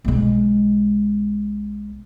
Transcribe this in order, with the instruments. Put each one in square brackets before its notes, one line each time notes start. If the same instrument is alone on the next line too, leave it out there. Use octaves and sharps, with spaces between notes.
[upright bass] B1 G#3